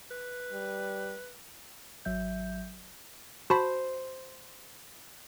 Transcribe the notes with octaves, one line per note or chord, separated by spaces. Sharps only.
B4
G3
G#1 F#3 E5 G6
F#4 C5 A5 B5